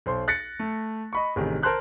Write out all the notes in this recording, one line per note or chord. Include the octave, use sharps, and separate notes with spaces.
B1 C5 C6
F#6 A6 A#6 C#7
A3
D#5 B5 C#6
A1 C3 D#3 G#4
A#4 C5 A5 C6 F#6 G6